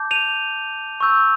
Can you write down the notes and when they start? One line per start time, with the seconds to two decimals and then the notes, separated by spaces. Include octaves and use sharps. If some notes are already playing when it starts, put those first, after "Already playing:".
Already playing: A5 D6 G6
0.11 D#7 F7
1.00 C#6 E6 G6